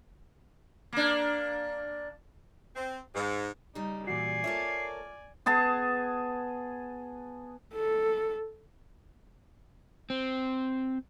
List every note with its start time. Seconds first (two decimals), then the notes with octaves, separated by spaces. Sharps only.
0.93 A#3 D4
2.75 C4
3.14 G#2
3.75 C#3 G3 D#4
4.07 A#2 E3 F#4 D5 G#5 C7
4.44 A#3 F4 A4 C#5 E5
5.46 B3 G#4 A5
7.75 A4
10.10 C4